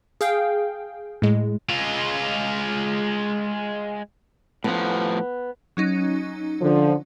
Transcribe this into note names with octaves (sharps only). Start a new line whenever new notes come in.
G#4 F5 G5
A2 G#3
G#3 F4
A2 F3 B3
F#3 C#4 D#4
D3 F3